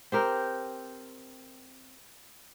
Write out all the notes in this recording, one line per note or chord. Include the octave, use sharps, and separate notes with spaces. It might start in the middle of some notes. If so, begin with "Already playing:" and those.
C4 G4 A#4